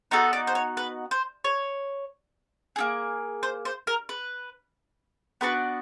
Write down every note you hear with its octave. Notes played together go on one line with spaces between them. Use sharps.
B3 D#4 F#4 A4
D5
C5
C#5
B4
C5
C#5
A#3 D#4 G#4
C5
C5
A#4
B4
B3 D4 F#4 B4